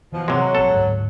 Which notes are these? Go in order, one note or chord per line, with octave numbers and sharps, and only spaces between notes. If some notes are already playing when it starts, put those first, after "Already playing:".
B2 E3 F3
C3 F#3 G#3
A#1 C4 A4
D1 G#2